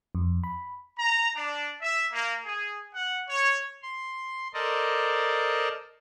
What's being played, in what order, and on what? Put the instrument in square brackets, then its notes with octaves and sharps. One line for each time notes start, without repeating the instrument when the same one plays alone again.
[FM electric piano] F2
B5
[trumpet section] A#5
D4
E5
A#3
G#4
F#5
C#5
[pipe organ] C6
A4 A#4 C5 D5 D#5 A5